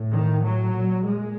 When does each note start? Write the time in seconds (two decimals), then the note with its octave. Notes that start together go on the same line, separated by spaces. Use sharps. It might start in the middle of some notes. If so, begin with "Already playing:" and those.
Already playing: A2
0.10 D#3
0.43 F#3
0.74 A#2
1.05 G#3